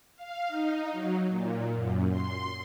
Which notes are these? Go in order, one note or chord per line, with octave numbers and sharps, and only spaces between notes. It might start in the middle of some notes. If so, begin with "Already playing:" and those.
F5
D#4
F#3
A#2
F#2
C6